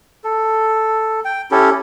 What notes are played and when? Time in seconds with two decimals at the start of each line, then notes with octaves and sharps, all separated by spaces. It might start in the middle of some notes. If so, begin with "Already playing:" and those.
0.24 A4
1.25 G5
1.51 C#4 E4 G4 A4